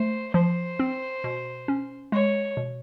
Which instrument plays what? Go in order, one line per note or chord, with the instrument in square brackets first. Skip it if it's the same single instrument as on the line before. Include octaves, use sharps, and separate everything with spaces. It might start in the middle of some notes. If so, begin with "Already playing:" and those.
Already playing: [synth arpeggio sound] A3 [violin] C5
[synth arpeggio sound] F3 [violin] C5
[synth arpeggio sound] C4
B2
C#4
[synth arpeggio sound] G#3 [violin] C#5
[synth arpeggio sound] B2